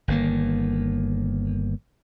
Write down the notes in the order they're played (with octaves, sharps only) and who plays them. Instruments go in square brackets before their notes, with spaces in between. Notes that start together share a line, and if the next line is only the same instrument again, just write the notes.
[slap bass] G1 D#3 A#3